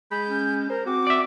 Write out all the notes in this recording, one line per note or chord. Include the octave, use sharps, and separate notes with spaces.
G#3 B5 G6
C#4
A#4 C5 A#5
C4 F#4 D6
D5 E5